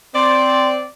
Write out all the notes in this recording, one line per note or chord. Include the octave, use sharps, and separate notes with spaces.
C4 D5 C6